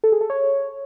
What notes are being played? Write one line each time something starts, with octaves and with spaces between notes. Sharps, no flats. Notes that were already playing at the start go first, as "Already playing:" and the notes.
A4
G#4
A4
C#5